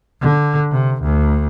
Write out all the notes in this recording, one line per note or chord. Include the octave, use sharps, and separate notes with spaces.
D3
C3
D2